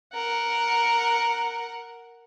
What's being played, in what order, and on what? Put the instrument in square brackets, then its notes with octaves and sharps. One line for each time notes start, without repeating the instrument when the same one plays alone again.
[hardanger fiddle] A#4 F#5